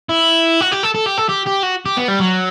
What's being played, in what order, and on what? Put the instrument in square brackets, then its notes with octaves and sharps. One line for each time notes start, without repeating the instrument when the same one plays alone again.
[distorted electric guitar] E4
F#4
G4
A4
A4
G4
A4
G4
G4
F#4
G4
B3
G3
F#3